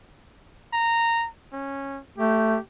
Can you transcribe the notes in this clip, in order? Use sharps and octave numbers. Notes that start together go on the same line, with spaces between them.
A#5
C#4
A3 G4